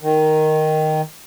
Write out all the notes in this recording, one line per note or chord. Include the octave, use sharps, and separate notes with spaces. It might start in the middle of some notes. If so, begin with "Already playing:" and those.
D#3